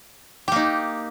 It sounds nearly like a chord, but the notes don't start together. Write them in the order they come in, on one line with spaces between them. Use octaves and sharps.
G4 A#3 D#4